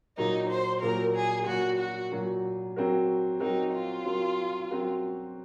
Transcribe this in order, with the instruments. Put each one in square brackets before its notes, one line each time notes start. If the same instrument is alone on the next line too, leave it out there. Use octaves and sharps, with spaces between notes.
[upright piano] A#2 F#3 A#3 [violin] D#4
[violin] C5
[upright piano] A#2 F#3 A#3 [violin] A#4
[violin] G#4
[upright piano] A#2 F#3 A#3 [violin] F#4
[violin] F#4
[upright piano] A#2 F#3 A#3
F#3 C4 F#4 A#4
[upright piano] F#3 C4 F#4 A#4 [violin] D#4
[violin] F4
[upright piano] F#3 C4 F#4 A#4
F#3 C4 F#4 A#4